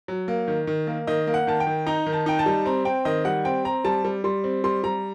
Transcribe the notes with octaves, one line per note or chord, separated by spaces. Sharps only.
F#3
A#3
D#3
D#3
A#3
D#3 D#5
A#3
F#5
D#3 A5
G5
D#3
D#4 A#5
D#3
A5
D#4 G5
A5
G3
C4 A#5
C4 G5
D#3 D#5
G3 F#5
C4 G5
C4 A#5
G3 A5
G3
G3 C6
C4
G3 C6
G3 A#5